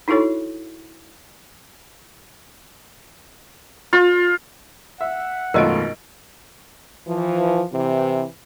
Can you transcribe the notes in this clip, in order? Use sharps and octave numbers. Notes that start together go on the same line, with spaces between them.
D#4 E4 F#4 A4 C#5
F4
E5 F#5
G#1 F#2 B2 A3 F4 A#4 D#5 D7
E3 F3
C3 E3